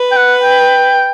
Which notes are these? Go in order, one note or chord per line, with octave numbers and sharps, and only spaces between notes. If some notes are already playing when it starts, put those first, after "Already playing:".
Already playing: B4
G5
F#5
G5